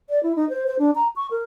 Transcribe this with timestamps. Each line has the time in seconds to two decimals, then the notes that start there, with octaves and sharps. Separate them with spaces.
0.10 D5
0.23 E4
0.36 D#4
0.50 C5
0.68 C5
0.79 D4
0.95 A#5
1.16 C#6
1.31 A#4